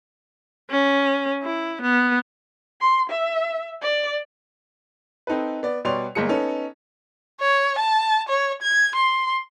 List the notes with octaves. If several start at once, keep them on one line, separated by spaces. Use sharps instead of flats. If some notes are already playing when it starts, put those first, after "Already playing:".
C#4
E4
B3
C6
E5
D5
C4 D#4 A4 B4
B3 D5
B2 G3 C#5 D5 C6 F7
G1 G#3 A#3 G#4 C#7
B3 C#4 D#4 A4
C#5
A5
C#5
G#6
C6